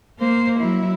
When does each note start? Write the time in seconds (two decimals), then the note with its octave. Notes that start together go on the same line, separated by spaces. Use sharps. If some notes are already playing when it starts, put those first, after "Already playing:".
0.19 A#3 C5
0.59 F#3 E4